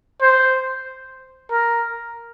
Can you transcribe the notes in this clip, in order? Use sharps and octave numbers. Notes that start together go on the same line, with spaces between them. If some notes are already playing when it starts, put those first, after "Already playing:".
C5
A#4